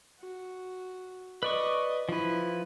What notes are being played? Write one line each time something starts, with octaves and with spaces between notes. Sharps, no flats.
F#4
B4 D5 D#5 C#6
F3 E4 B4